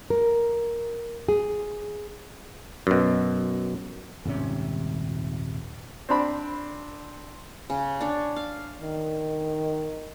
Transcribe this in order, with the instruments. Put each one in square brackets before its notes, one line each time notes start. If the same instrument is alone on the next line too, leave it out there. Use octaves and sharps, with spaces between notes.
[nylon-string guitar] A#4
G#4
[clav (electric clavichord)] F#2 B2
[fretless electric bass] D#1 G#2 C3 C#4
[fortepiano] C4 D4 B5
[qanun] C#3
D4 C#5
F5
[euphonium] D#3